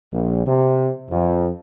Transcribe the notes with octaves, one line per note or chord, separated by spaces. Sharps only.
A#1
C3
F2